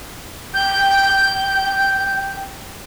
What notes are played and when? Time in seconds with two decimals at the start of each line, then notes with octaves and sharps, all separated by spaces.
0.54 G5 G6